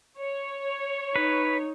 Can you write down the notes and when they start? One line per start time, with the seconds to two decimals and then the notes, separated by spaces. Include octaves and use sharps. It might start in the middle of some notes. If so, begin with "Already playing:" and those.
0.19 C#5
1.16 D#4 B4